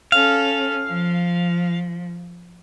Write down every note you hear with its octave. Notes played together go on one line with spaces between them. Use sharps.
C#4 A4 F5
F3